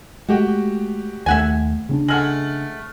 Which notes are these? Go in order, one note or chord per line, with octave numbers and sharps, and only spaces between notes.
G#3 A3 F#4 G4 G5
D#2 A3 E5 F#5 G#5
C#3 C4 D4
G#3 A3 F#5 F6 F#7